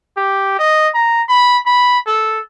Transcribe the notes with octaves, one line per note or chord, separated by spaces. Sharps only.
G4
D#5
A#5
B5
B5
A4